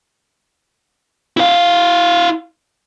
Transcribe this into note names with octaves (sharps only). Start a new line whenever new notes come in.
E4 F5